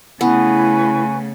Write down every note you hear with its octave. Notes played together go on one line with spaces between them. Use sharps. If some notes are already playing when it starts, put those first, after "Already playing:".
C#3 A3 B3 E4 B4 G#5 C#6